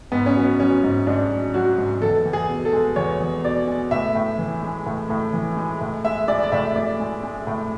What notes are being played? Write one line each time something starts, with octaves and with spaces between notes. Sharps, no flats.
G#2 B3
C#4
F#3 B3
F#3 C#4
G#2
G#2 D4
F#3
F#3 F#4
G#2
E2 A4
E2
G#4
B2
A4
G#3
E2 C#5
E2
B2 D5
G#3
A2 E5
A2
E3
G#3
A2
A2
E3
G#3
A2
G#3 E5
G#3 D5
D5
A2 E5
A2 D5
G#3
G#3
A2